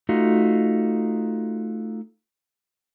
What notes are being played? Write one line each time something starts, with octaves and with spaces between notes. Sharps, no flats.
A3 D#4 F4 F#4